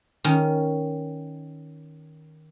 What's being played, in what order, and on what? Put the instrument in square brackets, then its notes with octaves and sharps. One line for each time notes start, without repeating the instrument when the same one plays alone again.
[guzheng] D#3 C#4